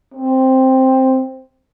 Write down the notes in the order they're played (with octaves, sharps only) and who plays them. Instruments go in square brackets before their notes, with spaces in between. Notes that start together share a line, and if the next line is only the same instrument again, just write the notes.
[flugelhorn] C4